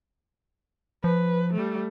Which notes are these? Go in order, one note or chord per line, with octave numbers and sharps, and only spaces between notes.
F3 B4
G3 A3